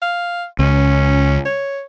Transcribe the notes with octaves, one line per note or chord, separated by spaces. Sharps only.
F5
C#2 C#4
C#5